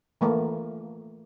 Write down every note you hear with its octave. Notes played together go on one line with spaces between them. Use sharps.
E3 A3 A#3